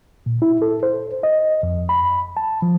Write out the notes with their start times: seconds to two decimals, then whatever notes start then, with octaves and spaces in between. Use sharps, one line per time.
0.26 A#2
0.42 E4
0.62 A4
0.83 C5
1.23 D#5
1.63 F2
1.89 B5
2.37 A5
2.62 F3